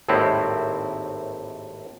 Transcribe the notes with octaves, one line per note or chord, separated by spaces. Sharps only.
G#1 D#2 A2 C4 E4